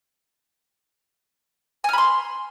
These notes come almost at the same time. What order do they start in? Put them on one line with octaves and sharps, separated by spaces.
G#5 F6 B5 C6